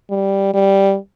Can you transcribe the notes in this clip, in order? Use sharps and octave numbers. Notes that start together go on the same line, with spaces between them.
G3
G3